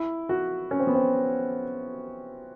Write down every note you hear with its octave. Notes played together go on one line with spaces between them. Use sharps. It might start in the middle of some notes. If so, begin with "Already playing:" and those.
Already playing: E4
F#4
C#4
C4
B3
C4